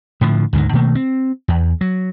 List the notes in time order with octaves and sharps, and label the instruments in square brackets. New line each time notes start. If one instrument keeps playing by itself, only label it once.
[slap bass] A2 D3 F3
D2 G#2 D3 D#3
B2 D#3 A3 A#3
C4
E2
F#3